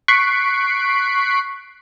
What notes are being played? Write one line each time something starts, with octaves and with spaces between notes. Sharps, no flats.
C#6 F#6 B6 C7 D7